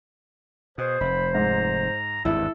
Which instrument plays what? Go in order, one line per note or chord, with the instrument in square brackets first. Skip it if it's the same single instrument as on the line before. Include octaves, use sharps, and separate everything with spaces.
[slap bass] B2 [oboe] G#4 [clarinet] C5
[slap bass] F1 [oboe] B5
[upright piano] G#2 [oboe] A#5
[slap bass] G#1 E2 G2 [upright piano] E4 [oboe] A4